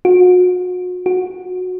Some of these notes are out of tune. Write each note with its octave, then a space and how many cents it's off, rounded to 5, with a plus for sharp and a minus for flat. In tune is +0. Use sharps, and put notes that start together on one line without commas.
F#4 -40
F#4 -20